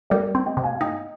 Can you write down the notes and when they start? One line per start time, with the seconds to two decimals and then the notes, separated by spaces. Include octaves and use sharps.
0.10 G3 A#4 D5
0.35 C4
0.46 D#5 G5
0.57 C3
0.63 F5 G#5
0.75 F5
0.81 D#4 D#5 G5